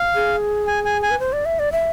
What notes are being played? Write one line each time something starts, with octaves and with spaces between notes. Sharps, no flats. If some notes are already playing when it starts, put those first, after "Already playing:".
Already playing: F5
G#4
G#5
G#5
G#5
B4
C5
D5
E5
D5
E5